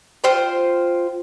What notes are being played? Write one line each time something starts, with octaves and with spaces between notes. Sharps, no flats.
F4 C5 G5